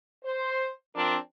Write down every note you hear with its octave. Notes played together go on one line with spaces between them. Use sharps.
C5
F3 C4 D4 A#4